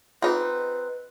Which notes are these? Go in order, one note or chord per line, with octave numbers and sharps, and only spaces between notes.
C4 D#4 F4 G#4 B4 F#5